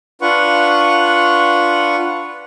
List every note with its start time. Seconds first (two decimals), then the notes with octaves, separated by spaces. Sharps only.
0.21 D4 F4 B4 F#5 C#6